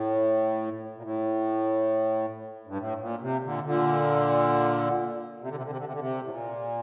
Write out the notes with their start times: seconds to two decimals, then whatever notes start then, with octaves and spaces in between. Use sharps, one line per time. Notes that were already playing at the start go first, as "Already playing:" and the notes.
Already playing: A2
0.96 A#2
1.03 A2
2.67 G2
2.78 A2
3.00 A#2
3.22 C3
3.44 A#2 D3
3.65 A#2 D3
5.42 C3
5.48 D3
5.56 C3
5.64 D3
5.70 C3
5.78 D3
5.86 C3
5.93 D3
5.99 C3
6.24 A2
6.30 A#2